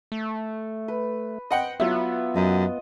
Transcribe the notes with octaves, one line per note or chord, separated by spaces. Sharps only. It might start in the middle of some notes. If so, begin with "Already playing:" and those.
A3
B4
C5 D#5 F#5 G5
F#3 B3 E4 F4 E5
F#2 D#5